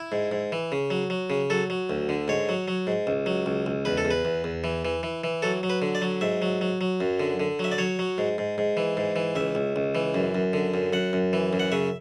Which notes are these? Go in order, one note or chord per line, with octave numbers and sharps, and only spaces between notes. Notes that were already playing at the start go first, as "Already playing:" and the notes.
Already playing: E4
G#2
G#2
E3
C#3
F#3
F#3
C#3
F#3 A4
F#3
D2
D3
G#2 C#5
F#3
F#3
G#2
C#2
F#3
C#2
C#2
E2 B4
A4
E2
B4
E2
E2
E3
E3
E3
E3
F#3 A4
F#3
B4
D3
D5
F#3
G#2 E5
F#3
F#3
F#3
F#2
D3
D3
F#3 E5
D5
F#3 C#5
F#3
G#2
G#2
G#2
E3
G#2
E3
C#2 E5
C#2
C#2
E3
F#2
F#2
D3
F#2
F#2 F#5
F#2
E3
F#2
F#5
C#3 E5